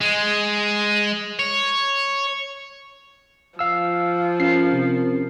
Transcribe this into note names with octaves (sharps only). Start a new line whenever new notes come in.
G#3
C#5
F3 F5 E6
C#4 F4 A#4 C7
C3